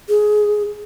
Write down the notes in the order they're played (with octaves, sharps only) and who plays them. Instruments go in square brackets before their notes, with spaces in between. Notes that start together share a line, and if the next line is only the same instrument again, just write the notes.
[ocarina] G#4